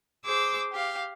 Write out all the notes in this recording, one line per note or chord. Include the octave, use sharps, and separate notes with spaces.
G#4 C5 D6 E6
G4 F5